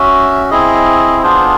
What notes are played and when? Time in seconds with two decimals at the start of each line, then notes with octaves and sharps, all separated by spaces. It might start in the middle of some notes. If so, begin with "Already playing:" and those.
Already playing: C#4 F#4 E5
0.51 C4 E4 G#4 D#5
1.23 B3 D4 F4 G#4 C5